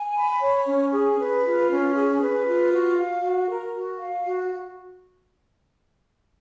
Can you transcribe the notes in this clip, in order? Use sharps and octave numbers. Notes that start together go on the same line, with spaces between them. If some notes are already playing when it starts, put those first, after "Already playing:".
Already playing: G#5
B5
C#5
C#4
G#4
B4
F4
C#4
G#4
B4
F4
F#4
F5
F#4
A#4
F#4
F5
F#4